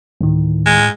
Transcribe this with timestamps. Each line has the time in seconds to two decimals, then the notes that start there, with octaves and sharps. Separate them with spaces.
0.21 D2 A2 D#3
0.66 G#3